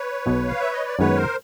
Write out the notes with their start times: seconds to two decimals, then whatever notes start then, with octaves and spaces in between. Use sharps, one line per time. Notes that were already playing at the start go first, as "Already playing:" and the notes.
Already playing: B4 C#5
0.26 B1 B2 F#3
0.48 F5
0.60 E5
0.73 D#5
0.86 D5
0.99 F#2 D#3 G#3 B3 B4 C#5
1.17 A#4 C5